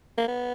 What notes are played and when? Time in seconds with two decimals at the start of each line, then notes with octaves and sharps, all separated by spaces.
0.18 A#3
0.28 B3